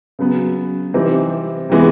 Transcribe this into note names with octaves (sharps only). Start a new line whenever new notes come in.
C#3 F#3 B3
C3 E3 G3 C4 D#4
C3 E3 G#3 B3